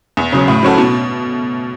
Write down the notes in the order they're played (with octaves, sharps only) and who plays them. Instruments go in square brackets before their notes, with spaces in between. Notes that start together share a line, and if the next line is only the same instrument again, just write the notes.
[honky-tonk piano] E2
C#3 F#3
A2
F#3 C#4 F#4 A4
B2